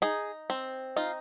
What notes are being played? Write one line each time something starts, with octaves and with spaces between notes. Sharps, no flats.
D#4 G#4
C4
D#4 F4